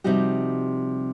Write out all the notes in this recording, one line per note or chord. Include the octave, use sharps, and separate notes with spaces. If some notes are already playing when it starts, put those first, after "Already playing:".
C3 F3 G3 D#4 F#4 G4